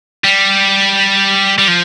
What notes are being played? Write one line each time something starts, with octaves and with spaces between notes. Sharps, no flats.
G3
G3
F3